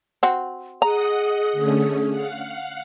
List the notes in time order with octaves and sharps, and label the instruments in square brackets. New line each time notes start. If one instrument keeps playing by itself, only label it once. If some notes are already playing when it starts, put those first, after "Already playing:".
[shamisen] C4 F#4
[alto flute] G#4 [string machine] D#5 F#5 D#6 [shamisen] A#5
[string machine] D3 A3 C#4
F5 F#5